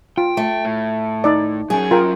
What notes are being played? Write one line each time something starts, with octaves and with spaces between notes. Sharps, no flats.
F4 G5
A3
A2
D#4 D5
F#3 C#4 G#4
F4 A#4 G5